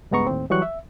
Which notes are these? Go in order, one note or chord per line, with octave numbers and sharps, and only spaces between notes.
C#2 G2 G#3 B3 A#5 C#6
D#2 A2 C4
E3 F#3 G3 C#6 F#6
E5